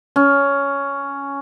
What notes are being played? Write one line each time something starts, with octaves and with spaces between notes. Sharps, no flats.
C#4